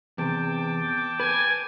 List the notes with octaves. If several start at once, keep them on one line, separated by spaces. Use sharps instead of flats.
E2 C3 G5 A5 D6
B4 G#5